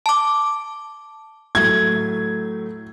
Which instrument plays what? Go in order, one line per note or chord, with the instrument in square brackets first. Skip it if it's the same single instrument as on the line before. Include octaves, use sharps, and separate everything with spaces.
[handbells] A5 D6
[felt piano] A2 F#3 A3 [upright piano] G#6